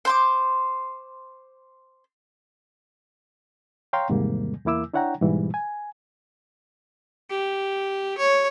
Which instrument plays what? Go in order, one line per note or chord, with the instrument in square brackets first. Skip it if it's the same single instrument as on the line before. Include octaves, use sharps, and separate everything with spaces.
[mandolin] C5 C6 D6
[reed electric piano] C#5 F5 G5 A#5 C6
E2 G#2 C3 D#3 G3 A#3
E2 A#3 E4 D6 E6
D4 E4 C#5 F#5 G5 A#5
G#2 B2 E3 G3
G#5
[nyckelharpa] G4
C#5